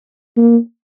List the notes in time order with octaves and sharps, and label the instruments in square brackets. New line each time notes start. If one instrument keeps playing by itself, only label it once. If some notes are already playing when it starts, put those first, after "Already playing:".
[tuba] A#3